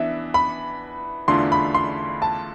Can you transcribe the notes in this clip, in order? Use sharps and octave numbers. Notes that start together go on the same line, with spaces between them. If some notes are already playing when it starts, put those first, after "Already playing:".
Already playing: E3 B3 D4 E5
B5
E2 D3 A3 D4 F4 C6
B5
C6
A5